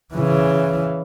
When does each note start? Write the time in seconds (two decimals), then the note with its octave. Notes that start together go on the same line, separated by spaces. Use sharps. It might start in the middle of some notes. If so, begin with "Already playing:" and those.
0.14 C#3 E3